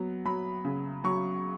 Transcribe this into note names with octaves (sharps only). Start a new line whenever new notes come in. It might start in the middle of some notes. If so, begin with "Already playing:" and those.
Already playing: F#3 B3
F#3 B5
C#3
F#3 C#6